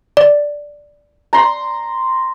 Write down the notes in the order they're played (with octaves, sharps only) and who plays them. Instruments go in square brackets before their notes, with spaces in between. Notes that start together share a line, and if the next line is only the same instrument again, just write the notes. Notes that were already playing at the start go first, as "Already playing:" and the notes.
[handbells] D5
[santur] A#5 C6